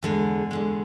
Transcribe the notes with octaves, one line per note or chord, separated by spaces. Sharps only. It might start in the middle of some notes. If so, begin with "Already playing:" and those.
E2 D3 G#3 G#4
E2 D3 G#3